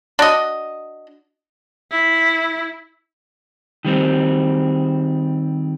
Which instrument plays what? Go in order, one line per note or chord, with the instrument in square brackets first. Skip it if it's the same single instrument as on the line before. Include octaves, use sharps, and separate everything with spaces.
[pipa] D4 F#4 D#5
[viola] E4
[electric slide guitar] D#3 G3 C4